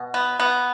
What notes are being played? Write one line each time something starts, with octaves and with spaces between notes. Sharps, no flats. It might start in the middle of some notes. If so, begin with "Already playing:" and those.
Already playing: B2
B3
B3